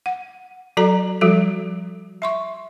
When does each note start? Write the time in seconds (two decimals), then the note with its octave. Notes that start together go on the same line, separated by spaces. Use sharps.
0.06 F#5
0.77 F#3 F#4 A4 D5 A#5
1.21 F3 G3 F#4 A4
2.22 E5 C6 C#6